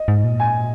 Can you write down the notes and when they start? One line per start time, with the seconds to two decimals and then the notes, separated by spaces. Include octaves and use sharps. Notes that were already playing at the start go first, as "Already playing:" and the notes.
Already playing: D#5
0.08 G#2
0.24 A#2
0.40 G#5